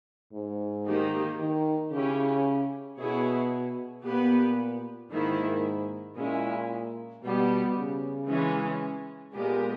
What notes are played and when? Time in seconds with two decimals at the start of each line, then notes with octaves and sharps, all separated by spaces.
0.33 G#2
0.86 D#3 A#3 D#4 G4
1.39 D#3
1.92 C#3 C#4 E4 G4
2.98 B2 B3 E4 G#4 C#5
4.04 A#2 B3 G4 B4
5.11 G#2 D#3 A#3 E4
6.17 A#2 G#3 C#4 E4
7.24 B2 G3 B3 G4
7.77 C#3
8.29 E3 G#3 C#4
9.35 A#2 G#3 B3 G4 A#4